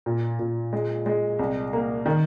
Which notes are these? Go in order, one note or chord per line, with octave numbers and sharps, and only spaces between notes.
A#2
A#2
G#3
G#3
C2
A#3
D#3